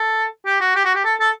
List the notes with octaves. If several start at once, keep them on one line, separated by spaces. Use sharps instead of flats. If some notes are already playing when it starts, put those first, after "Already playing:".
Already playing: A4
G4
F#4
G4
F#4
G4
A4
A4